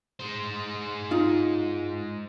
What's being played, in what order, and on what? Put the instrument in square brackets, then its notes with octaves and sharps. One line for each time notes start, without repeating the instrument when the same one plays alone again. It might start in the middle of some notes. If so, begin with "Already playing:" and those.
[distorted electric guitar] G#3 C5
[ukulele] D#4 F4